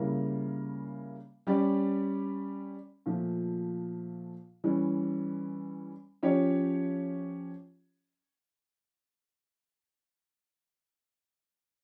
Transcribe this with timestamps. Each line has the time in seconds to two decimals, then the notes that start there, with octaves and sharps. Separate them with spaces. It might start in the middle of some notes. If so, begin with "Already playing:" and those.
Already playing: C#3 G3 A#3 E4 A#4
1.47 G3 C#4 G4 D5
3.06 A#2 F3 A3
4.64 E3 G3 C#4
6.23 F3 C#4 G4 C#5